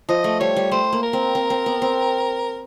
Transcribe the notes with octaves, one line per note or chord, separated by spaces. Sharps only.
F3 D#5
A3
G3 C#5
G3
A3 C5
A#3
A#4
C4
C4
C4
B3
C4